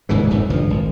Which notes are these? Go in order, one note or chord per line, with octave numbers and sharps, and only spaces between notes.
D#1 G#2 C#3 E3
G1 F2 G#2 A3
G#1 C#2 G2 F3
G#1